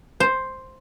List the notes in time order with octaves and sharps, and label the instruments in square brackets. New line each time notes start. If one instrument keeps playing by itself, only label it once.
[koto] C5